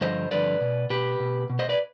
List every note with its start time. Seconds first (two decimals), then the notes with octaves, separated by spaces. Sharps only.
0.01 G2 D3 F3 C5 D#5
0.31 G2 D3 F3 B4 D5
0.61 B2
0.90 B2 G4 B4
1.20 B2
1.50 B2
1.59 C5 D#5
1.69 B4 D5